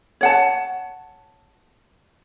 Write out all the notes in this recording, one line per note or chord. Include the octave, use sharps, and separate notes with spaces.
C#5 F#5 A5